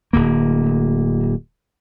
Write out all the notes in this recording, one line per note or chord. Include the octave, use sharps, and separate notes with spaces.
D1 D2 A#3